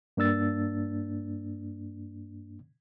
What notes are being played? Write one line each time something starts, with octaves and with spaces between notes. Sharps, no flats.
G2 A#3 D4 E6 A6